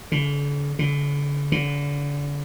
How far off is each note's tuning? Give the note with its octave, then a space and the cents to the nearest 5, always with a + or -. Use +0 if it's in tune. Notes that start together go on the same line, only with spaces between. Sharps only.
D3 -45
D3 -40
D3 -35